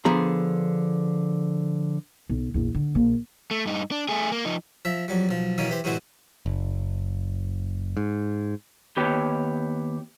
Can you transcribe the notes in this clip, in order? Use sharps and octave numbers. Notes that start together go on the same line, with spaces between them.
D3 F3 B3 G#4 A#5
B1
A#1 E2
D3
A#1 A#2
A3
G2 D#4
D4
A3 G#4
A#3
F3 D#4
F3 E5
F2 F#3 G3
B1 F3
B2 D#3 E3 A#3 C#4
E3 G4 C5
A2 C3 E3 G#3 F#4 C5
F#1
G#2
D#2 B3 G4 B4 C#5 G5